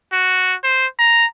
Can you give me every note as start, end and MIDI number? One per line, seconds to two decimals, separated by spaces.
0.13 0.55 66
0.64 0.86 72
0.99 1.25 82